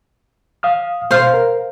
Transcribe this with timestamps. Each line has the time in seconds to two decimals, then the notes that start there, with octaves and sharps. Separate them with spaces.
0.63 F5 D#6 F6
1.11 B2 C5 F5
1.34 A#4